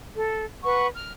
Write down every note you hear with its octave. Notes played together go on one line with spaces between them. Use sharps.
A4
B4 F#5 C#6
F6